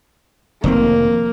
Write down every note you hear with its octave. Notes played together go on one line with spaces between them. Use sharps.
F1 D#3 A#3 C4